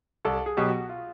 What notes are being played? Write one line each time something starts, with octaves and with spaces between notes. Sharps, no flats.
C2 A4
G#4
B2 F#3 G4
F#4
F4